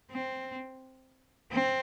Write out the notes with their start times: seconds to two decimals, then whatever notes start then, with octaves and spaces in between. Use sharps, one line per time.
0.11 C4
1.52 C4